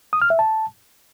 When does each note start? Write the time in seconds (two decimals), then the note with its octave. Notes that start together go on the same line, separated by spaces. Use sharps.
0.13 D#6
0.22 F6
0.30 E5
0.39 A5